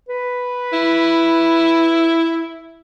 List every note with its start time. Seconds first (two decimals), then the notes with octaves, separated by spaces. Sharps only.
0.09 B4
0.73 E4